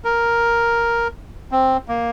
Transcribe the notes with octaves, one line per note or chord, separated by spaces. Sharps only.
A#4
C4
A#3